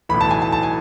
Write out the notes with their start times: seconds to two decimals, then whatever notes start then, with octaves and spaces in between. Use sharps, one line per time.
0.09 B1 A2 E3 B5
0.21 A5
0.31 G#5
0.42 A5
0.52 A5
0.63 G#5